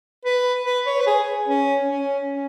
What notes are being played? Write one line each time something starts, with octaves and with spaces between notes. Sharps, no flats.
B4
B4
C#5
B4
G#4
C#4
C#4
C#4